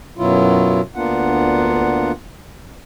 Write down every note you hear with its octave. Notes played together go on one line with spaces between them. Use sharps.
F#2 B2 F#3 E4 F4
D2 A#3 B3 D4 F4 F#5